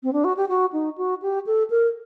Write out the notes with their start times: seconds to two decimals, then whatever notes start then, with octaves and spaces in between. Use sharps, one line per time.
0.03 C4
0.13 D4
0.24 F#4
0.37 G4
0.49 F#4
0.73 D#4
0.98 F#4
1.22 G4
1.46 A4
1.70 A#4